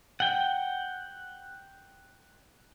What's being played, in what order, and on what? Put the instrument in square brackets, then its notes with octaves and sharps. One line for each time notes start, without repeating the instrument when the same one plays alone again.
[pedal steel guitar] F#5 G5